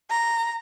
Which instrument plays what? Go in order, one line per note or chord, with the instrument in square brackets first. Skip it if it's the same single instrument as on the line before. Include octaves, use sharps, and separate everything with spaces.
[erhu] A#5